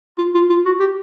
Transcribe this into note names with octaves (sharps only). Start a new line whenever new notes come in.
F4
F4
F4
F#4
G4